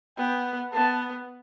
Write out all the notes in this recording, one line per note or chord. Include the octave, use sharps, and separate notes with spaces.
B3 G5
B3 A5